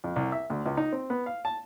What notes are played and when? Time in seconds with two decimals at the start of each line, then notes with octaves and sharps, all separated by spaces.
0.04 F2
0.16 C2
0.32 E5
0.50 D2
0.65 C#2
0.77 D#4
0.92 C4
1.10 B3
1.26 F5
1.45 A5